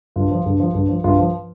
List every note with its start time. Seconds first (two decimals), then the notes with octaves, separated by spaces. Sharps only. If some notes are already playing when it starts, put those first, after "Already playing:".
0.16 G2 F4
0.31 F3
0.46 G2
0.60 F3
0.74 G2
0.89 F3
1.04 G2 F4
1.19 F3